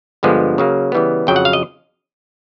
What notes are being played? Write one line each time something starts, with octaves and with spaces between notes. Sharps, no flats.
G2 D3 F3 G#3 B3
C#3 F#3 A#3
C#3 E3 G3 B3
F2 C#3 F#3 G5
F#5
F5
D#5